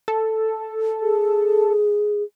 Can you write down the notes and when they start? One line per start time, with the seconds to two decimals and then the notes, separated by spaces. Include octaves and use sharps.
0.08 A4
1.02 G#4